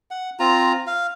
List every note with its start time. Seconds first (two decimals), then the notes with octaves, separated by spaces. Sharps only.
0.11 F#5
0.39 C4 F4 A#5
0.87 F5